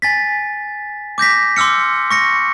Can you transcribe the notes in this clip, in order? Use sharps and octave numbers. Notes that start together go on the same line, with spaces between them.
G#5 A6 B6
D6 G6 A#6 B6
C6 D6 E6 F6 C#7
C#6 A#6 C#7